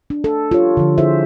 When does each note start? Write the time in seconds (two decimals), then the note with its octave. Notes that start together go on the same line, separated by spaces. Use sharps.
0.10 D4
0.24 A4
0.51 F4 G4 C#5
0.77 D3 F3
0.98 E4 G#4 A4 C5 E5